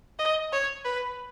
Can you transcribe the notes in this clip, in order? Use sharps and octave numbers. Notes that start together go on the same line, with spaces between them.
D#5
C#5
B4